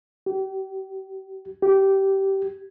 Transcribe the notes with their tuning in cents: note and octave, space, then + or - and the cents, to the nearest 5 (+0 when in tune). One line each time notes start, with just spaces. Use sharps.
G4 -35
G4 -15